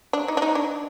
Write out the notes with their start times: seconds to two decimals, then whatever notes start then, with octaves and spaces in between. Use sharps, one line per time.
0.13 D4
0.28 D#4
0.37 D4
0.42 D#4
0.55 D4